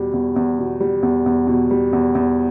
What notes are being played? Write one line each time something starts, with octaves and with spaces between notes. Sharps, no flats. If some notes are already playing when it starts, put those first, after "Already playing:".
Already playing: E2 B2 G3
E2
E2
B2
G3
E2
E2
B2
G3
E2
E2